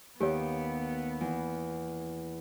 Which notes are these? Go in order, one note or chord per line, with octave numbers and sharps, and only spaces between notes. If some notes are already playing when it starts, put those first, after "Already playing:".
D#2 B3 G4 C#5
E2